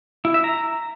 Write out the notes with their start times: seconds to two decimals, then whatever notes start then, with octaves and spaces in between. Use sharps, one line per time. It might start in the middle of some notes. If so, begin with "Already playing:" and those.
0.25 E4
0.34 E5
0.44 A#5